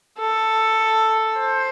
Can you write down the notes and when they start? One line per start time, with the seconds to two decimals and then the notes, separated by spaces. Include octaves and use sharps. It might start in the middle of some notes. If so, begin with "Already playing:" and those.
0.19 A4
1.41 C5